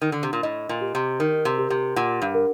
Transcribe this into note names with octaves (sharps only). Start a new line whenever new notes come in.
D#3
D3
C3
A#2
A2 D#5
A#2
G4
C3
D#3 A#4
C3
G4
C3
A#2 F#5
G2
A#4